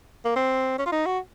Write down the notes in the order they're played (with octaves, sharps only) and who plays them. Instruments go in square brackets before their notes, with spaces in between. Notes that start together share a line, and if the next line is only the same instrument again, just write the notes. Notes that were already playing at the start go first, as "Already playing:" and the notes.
[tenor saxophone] A#3
C4
C#4
F4
D#4
F#4